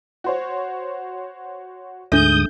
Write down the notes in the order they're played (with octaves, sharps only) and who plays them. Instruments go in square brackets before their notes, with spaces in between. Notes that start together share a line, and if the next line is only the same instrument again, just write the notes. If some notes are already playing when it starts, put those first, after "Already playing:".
[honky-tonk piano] F#4 C5 C#5
[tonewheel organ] D2 G#2 D#6 [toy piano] D4 A4 E5 [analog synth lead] G6